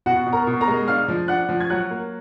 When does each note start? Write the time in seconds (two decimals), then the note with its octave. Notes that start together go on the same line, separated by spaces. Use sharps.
0.06 B2 F#4 F#5
0.26 B2
0.32 A#4 A#5
0.47 B2
0.61 A#4 A#5
0.68 G#3
0.88 D4 F5 F6
1.08 F3
1.28 D4 F#5 F#6
1.49 F3
1.60 G#6
1.70 F#3 F#5 F#6
1.91 A#3